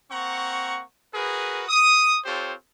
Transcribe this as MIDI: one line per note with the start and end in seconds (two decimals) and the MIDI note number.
0.11 0.83 58
0.11 0.83 60
0.11 0.83 78
0.11 0.83 82
0.11 0.83 85
1.13 1.64 66
1.13 1.64 68
1.13 1.64 70
1.13 1.64 71
1.68 2.19 87
2.25 2.54 60
2.25 2.54 65
2.25 2.54 67
2.25 2.54 69
2.25 2.54 72
2.25 2.54 73